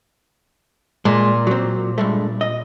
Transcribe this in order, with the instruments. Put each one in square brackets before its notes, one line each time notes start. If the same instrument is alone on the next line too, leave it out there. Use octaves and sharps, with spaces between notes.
[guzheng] A#2 [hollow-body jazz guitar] G#3
[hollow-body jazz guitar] F#3 C4
G2 G#3 A3
D#5